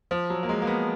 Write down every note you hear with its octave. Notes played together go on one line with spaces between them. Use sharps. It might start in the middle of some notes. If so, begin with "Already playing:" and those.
F3
F#3
A#3
G#3
A#3
B3